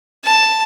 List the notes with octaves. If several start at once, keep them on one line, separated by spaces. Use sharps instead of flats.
A5